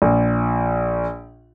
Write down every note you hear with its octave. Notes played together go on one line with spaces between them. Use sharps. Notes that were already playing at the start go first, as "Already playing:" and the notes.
A#1